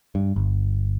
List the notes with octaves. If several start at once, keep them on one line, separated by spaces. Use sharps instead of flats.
G2
G1